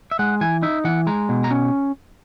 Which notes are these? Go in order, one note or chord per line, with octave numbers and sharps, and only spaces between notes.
E5
G#3 F#5
E3 G#5
D#4 E5
E3 F#5
G#3 A#5
B2
A#5
C#4